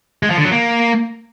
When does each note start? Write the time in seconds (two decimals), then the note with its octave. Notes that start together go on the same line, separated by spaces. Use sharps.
0.23 G#3
0.30 F3
0.37 D3
0.45 F#3
0.52 A#3